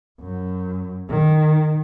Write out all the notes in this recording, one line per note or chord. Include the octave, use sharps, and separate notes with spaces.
F#2
D#3